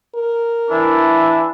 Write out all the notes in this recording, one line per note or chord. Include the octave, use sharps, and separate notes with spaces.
A#4
E3 D4 E4